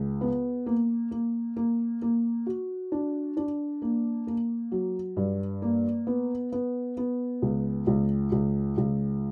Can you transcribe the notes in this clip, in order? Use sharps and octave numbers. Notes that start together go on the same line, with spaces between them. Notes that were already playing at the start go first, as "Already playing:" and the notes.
Already playing: C#2
B3
A#3
A#3
A#3
A#3
F#4
D4
D4
A#3
A#3
F#3
G2
A#3
B3
B3
B3
C#2
C#2
C#2
C#2